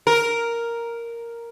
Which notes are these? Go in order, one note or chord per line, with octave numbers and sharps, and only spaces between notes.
A#4